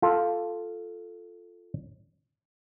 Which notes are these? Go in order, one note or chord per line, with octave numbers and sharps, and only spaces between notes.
F4 A4